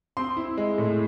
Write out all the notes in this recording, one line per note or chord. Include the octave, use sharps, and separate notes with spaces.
C4 C6
E4
G#3
A2